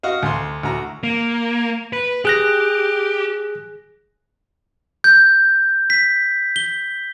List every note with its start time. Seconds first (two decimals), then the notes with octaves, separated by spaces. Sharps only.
0.03 F#4 D#5 F5
0.23 D2 C6
0.63 D2 F#4 A#5
1.03 A#3
1.93 B4
2.25 G4 G#4 F#6 A#6
5.04 G6
5.90 B6
6.56 G7